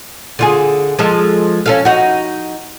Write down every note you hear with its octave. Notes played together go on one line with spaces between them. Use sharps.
D3 F4 G#4
F3 G#3 A4
C#4 A4 F5
D#4 F#4